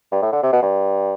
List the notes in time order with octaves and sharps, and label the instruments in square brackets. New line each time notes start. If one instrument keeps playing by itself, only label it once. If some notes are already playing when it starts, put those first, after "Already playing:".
[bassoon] G2
A2
D3
C3
B2
G2